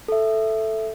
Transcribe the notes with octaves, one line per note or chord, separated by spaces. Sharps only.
A4 E5